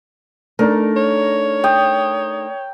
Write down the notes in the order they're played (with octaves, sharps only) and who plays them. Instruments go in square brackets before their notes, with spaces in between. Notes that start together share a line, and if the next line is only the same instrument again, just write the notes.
[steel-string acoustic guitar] A3 D4 D#4 [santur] A#4
[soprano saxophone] C#5
[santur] G5 D#6